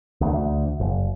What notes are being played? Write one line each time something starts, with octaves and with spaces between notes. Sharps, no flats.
D2
D2
F#1